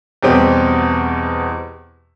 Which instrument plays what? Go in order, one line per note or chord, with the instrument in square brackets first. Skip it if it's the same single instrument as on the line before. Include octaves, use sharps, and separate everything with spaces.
[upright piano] E2 B2 G3 C4 G4